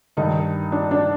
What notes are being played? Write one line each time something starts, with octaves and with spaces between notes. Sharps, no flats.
G2 D#3 D#4
D4
D4